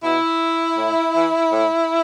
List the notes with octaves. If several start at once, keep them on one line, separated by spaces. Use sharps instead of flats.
B2 E4
A2
E3
A2